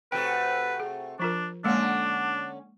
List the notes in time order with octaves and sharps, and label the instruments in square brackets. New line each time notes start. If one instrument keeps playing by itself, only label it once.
[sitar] C3 A3 F#4 [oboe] B4 [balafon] G5
[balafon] G#4
[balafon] F3 F4 A#4 [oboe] D4
[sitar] D3 C#4 [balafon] G#3 A#3 F#5 [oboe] D4